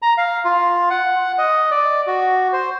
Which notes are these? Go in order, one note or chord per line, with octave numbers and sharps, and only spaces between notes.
A#5
F5
F4
F#5
D#5
D5
F#4
C5